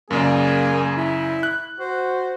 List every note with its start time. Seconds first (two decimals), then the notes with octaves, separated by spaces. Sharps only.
0.11 F#2 C#3 A#3 G#4 D5
0.97 E4
1.43 F#6
1.80 F#4 C5